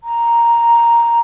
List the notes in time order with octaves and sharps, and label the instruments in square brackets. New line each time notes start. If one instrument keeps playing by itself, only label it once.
[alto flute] A#5